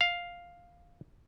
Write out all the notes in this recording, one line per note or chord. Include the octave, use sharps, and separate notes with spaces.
F5